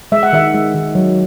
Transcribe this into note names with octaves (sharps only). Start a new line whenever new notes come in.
G#3 E5
F#5
D#3 E5
G#3
D#3
F#3